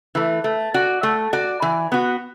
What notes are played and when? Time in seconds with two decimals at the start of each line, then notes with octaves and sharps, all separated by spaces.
0.15 E3 A3
0.44 A3
0.74 F#4 D5
1.03 A3
1.33 F#4 D5
1.62 E3
1.92 B3 F#4